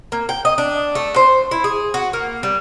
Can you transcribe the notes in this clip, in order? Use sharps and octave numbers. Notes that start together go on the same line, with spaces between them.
A#3
G5
D#5
D4
A3
C5
E4
G#4
F#4
A#3
G3